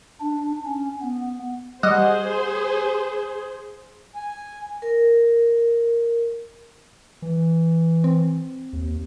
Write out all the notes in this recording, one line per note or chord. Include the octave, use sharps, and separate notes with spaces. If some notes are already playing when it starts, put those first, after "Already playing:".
D4
C#4
B3
G3 G#4 C5 D#5 F#5
G#5
A#4
E3
C4
D#2